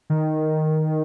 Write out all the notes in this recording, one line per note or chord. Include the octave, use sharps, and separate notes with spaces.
D#3